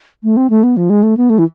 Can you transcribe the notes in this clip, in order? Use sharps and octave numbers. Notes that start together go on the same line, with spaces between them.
A3
C4
A3
B3
F3
G#3
A3
B3
A3
E3